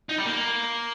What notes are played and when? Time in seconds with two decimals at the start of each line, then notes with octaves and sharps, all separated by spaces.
0.09 D#4
0.18 G3
0.26 A#3